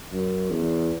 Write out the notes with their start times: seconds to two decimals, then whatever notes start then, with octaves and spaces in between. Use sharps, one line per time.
0.12 F#2
0.50 E2